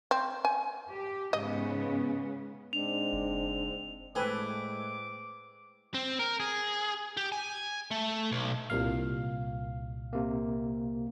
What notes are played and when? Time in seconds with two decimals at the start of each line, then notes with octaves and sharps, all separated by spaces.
0.11 C4
0.45 G#5
0.91 G4
1.33 G#2 C#3 B3 D#5
2.73 G#2 G#3 C4 D4 F7
3.13 F#1
4.15 A2 G#3 C4 A4 B4 G#5 D6
5.94 C4
6.19 A#4
6.40 G#4
7.17 G4
7.32 G#5
7.91 A3
8.31 B1
8.70 C2 A#2 F5
10.13 C3 A#3